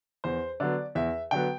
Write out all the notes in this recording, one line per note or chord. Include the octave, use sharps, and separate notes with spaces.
E2 C5
D3 F#3 B3 D5
E2 E5
D3 F#3 B3 G5